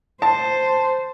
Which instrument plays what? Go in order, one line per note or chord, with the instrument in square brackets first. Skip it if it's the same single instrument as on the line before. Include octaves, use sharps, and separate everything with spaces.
[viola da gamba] C5 [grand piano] A5